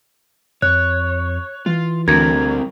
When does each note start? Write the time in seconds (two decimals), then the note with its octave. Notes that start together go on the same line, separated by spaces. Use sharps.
0.62 F2 C#5 F#6
1.66 E3 F4
2.08 D2 G3 C4 A#4 G#6